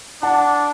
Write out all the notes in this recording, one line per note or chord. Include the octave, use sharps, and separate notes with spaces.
D4 F#5 A5